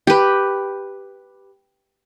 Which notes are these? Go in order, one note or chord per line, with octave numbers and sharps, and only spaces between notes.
G4 B4